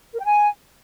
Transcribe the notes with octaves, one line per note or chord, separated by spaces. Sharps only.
A#4
G5
G#5